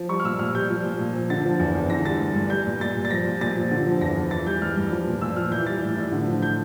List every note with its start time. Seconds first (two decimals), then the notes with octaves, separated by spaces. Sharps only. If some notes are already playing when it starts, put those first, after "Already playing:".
Already playing: F3
0.09 G3 C#6
0.20 F6
0.24 A#2 E6
0.39 A#2 F6
0.55 G3 G6
0.70 F3
0.84 A#2
0.99 A#2
1.15 F3
1.30 D3 A6
1.45 F3
1.59 E2
1.75 E2
1.90 D3 A#6
2.05 G3 A6
2.20 G2
2.36 G2
2.50 G3 G6
2.66 A#2
2.80 A#2 A6
2.96 G3
3.05 A6
3.10 F3 A#6
3.26 A#2
3.41 A#2 A6
3.56 F3
3.71 D3
3.85 F3
4.01 E2 A#6
4.16 E2
4.31 E3 A6
4.46 G3 G6
4.62 G2 F6
4.76 G2
4.91 F3
5.07 A#2
5.21 A#2 E6
5.36 F3 F6
5.52 E3 G6
5.66 G3 A6
5.82 A2
5.97 A2
6.12 D3
6.27 F3
6.42 G6